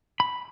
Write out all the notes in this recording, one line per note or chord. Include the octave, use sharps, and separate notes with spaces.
B5